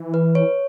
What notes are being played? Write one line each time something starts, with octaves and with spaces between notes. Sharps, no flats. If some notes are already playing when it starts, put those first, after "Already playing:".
Already playing: E3
B4
C#5